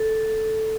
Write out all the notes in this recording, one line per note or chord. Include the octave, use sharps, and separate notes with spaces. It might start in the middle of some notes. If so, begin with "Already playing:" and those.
Already playing: A4